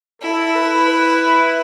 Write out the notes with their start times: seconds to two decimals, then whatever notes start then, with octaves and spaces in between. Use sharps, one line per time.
0.22 E4 A4
0.55 B4
0.89 B4